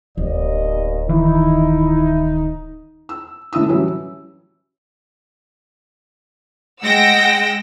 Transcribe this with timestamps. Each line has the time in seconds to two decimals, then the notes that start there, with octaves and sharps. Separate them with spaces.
0.18 D1 D#2 B3 D5 D#5
1.09 D#3 E3 D#4 E4
3.09 E6
3.53 A2 D3 E4 D#6 E6
3.68 E3 F#3 G3 C#4
6.83 G#3 F#5 G5 E6 A#6